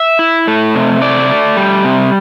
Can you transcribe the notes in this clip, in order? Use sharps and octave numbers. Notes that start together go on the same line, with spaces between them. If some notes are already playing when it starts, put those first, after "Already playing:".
Already playing: E5
E4
A3
C3
A3 D5
A3
G3
C3